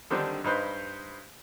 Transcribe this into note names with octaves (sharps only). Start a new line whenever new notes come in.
D3 D#3 G3 C4 D4 D#4
G2 D#4 B4 C5